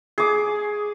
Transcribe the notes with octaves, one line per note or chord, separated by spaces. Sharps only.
G#4 D6